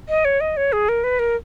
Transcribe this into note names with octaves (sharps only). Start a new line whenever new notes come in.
D#5
C#5
D#5
C#5
G#4
A#4
B4
A#4